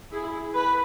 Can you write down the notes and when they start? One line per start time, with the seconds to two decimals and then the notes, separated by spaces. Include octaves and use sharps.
0.12 E4 G#4
0.54 B4